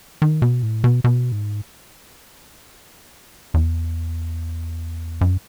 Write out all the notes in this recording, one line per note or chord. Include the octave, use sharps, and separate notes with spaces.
D#3
B2
A2
B2
B2
G#2
E2
F#2